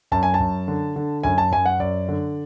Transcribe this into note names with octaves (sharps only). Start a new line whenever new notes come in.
F#2 A5
G#5
A5
F#2
D3
D3
F#2 G#5
A5
F#2 G#5
F#5
F#2 D5
D3